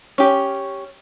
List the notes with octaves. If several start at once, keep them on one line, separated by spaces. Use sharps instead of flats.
C#4 G4